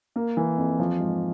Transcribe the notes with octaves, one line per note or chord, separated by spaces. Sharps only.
A#3
E3
F2
F3
G#2